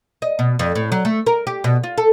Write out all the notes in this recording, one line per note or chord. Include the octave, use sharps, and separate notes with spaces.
D#5
B2
F2
A2
F#3
A3
A#4
G4
B2
F4
A4